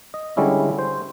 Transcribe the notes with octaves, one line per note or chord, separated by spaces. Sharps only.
D#5
D3 G3 G#3 C#4 E4
C5